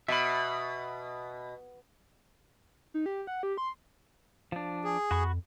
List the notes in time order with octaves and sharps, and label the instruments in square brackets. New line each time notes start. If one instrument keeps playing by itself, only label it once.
[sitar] B2 [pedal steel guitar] E5 B5
[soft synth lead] D#4
G4
F#5
G4
C6
[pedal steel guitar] F3 D4
[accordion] G#4
[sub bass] F2 [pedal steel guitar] F#4 B5 C#6